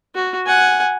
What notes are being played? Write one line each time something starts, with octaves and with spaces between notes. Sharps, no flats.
F#4
F#5 G#5